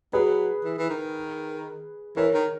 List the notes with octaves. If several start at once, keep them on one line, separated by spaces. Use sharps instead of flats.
F#3 G#4 B4
E3
E3
D#3
E3 A#4 C#5
D#3